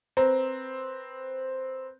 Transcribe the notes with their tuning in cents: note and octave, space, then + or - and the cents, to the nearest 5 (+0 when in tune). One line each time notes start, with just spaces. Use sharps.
C4 +0 B4 +0 A#5 +0